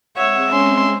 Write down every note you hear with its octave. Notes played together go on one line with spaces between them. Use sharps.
G#3 C4 C#5 E5 F#5
C#4 C6